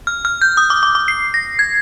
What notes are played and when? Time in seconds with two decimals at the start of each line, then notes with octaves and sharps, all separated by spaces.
0.07 F6
0.25 F6
0.41 G6
0.57 D#6
0.70 D6
0.83 D6
0.95 D6
1.08 C7
1.34 A#6
1.59 G#6